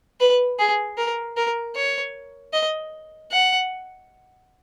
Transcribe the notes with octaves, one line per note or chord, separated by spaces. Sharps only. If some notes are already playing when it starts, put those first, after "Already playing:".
B4
G#4
A#4
A#4
C#5
D#5
F#5